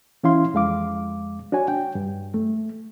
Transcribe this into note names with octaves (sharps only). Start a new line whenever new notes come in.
E3 C#4 E4 F5 C6
F2 G#3 F5 D6
D4 F#4 C#5 G#5
G5
G2
A3